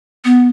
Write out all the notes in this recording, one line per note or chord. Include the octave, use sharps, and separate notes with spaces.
B3